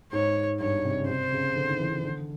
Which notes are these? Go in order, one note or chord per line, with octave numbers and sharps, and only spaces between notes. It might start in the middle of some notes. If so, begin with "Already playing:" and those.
G#2 C#5
G2 C#5
C3
C#3
C3 C5
C#3
D3
D#3
E3
D#3
D3